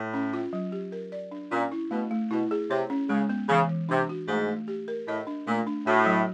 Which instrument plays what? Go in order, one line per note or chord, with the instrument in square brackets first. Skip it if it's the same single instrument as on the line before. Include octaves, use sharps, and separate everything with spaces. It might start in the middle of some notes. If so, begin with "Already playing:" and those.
Already playing: [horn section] A2
[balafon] C#4
F4
F#3
G4
A#4
D5
D4
[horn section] A#2 [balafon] C#4
[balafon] E4
[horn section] B2 [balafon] A3
[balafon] A3
[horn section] B2 [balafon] E4
[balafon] G#4
[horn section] C3 [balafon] C#5
[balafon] C#4
[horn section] C#3 [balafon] G#3
[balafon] B3
[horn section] C#3 [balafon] E3
[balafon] E3
[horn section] C3 [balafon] D4
[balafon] F#4
[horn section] G#2 [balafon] A3
[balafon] A3
G4
A#4
[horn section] A2 [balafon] D#5
[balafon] D4
[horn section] A#2 [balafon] A3
[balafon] D4
[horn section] A2 [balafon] F#4
[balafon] F#3